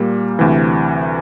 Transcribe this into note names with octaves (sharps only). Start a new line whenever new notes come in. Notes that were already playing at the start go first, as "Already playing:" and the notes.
Already playing: A#2 G3 A#3
D2 C3 E3